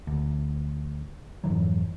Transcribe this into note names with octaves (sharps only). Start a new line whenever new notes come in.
D2
F2 G#2 E3 F#3